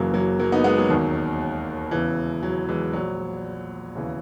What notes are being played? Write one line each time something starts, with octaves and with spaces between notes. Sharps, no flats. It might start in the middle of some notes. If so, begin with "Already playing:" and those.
Already playing: F#1 F#2 C#3 E3 F#3 A#3
F#3 A#3
F#3 A#3
B3 D#4
G#3 B3
F#3 A#3
E1 D#2 D#3
E1 E2 C#3 E3
F#3
E3 G#3
A#1 A#2 F#3
E1 D#2 C#3 E3